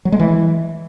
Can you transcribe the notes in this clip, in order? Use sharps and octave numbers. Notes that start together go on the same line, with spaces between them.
F#3
G#3
E3